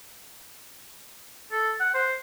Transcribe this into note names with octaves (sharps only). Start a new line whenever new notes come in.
A4
F#5
C5